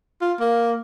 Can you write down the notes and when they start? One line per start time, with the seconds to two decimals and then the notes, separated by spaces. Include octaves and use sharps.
0.21 F4
0.40 A#3